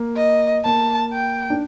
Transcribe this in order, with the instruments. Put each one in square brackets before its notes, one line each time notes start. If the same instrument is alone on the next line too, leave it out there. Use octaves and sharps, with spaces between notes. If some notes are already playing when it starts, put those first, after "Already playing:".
Already playing: [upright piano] A#3
[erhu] D#5
[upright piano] A#3 [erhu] A5
[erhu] G5
[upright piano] D4